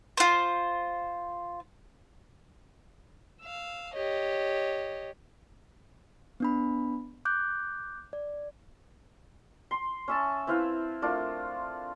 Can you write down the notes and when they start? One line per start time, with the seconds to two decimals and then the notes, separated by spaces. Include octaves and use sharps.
0.17 F4 C5
3.41 F5 E6
3.94 G4 C#5 D#5
6.40 B3 D4 B5
7.25 D6 F#6 G6
8.13 D5
9.71 C6
10.08 C#4 E5 A5
10.47 C4 E4 B4 F5
11.02 A3 D4 F4 A#4